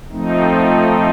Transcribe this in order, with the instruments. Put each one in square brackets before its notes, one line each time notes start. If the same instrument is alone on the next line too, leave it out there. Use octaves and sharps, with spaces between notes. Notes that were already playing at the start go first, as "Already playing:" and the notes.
[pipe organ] F3 A3 C4 D#4